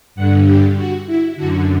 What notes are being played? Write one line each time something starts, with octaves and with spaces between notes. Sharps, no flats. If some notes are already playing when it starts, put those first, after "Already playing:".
G2 D3 F#5
G4
F#4
E4
F#2 D3 F#4